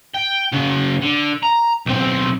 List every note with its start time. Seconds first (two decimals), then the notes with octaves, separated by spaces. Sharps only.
0.14 G5
0.52 C#3 F#4
1.03 D3
1.43 A#5
1.86 B1 C4